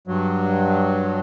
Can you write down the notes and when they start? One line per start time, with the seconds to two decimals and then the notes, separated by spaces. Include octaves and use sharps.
0.07 G2 F#3